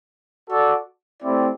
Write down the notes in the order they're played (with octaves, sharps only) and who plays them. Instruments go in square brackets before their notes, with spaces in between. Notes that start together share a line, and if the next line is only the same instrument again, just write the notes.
[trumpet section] F#4 A4 D5
A3 C4 E4 G4 D5